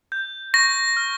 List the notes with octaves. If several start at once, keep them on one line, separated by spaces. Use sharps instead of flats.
G6
C#6 A#6
F6